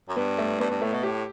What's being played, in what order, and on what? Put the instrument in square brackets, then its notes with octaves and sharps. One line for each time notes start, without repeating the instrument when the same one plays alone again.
[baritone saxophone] F#2
[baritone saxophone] G2 [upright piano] B3
[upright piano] A3
[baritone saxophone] G2 [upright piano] B3
[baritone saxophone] G2
[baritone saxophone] A2 [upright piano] A3
[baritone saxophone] B2
[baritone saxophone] A2 [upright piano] G4